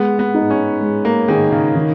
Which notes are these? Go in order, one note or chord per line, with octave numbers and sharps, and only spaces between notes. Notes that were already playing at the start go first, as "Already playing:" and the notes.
Already playing: G#3 B3
B3
D#4 G#4
C#4
G#3
A#3
D#3 D#4 G#4
C#3
D#3